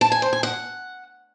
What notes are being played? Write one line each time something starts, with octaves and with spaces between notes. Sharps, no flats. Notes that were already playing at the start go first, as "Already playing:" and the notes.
A5
G#5
C5
G#5
F#5